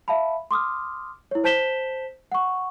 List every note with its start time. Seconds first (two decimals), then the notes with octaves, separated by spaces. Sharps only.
0.08 E5 F5 A5 B5
0.51 C6 D6 D#6 F6
1.31 E4 C#5
1.44 C5 A5 G6 B6 E7 G7
2.32 F#5 C#6